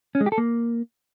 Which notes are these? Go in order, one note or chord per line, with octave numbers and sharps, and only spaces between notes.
C#4
G#3
G4
A4
A#3